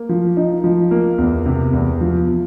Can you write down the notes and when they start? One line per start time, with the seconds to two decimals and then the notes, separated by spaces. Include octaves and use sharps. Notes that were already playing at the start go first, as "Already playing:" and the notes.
Already playing: A#3
0.09 F3
0.37 D#4
0.64 F3
0.91 A#3
1.18 E2
1.46 C3
1.73 E2
2.01 F3